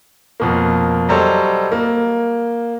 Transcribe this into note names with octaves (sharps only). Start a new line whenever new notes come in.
F2 B2 A#3
F#3 G3 A4 C5 C#5 D#5
A#3